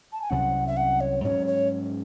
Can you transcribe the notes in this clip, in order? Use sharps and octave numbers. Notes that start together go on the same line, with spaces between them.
A5
G#5
C2 C3 F#3 C#4 F#5
E5
F#5
C#5
G#2 F#3 C#4 C#5
C#5